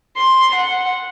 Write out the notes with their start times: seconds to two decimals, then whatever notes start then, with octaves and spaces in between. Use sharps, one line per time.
0.17 C6
0.54 F#5